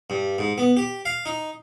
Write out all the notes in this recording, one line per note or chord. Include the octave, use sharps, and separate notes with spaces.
G2
G#2
B3
G4
F5
D#4